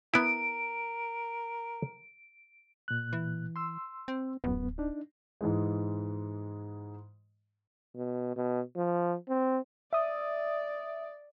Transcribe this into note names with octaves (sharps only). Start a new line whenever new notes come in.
B3 E4 A#4 D7
A#2 F#6
E3
C6 E6
C4
D1 F#2 B3
D4 D#4
G#2 E3 G#3
B2
B2
F3
C4
D5 E5 D#6